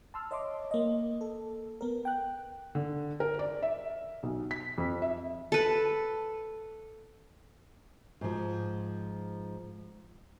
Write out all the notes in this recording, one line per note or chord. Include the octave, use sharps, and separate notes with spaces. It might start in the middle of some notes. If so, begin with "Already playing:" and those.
A5 C6 E6 F6
C#5 D#5 E5 C6 D6
A#3 D#5
A4
B3 A#4
G5 F#6
D3
A#4
D5
E5
B1
B6
F2
E5
A4 B4
G#2 F3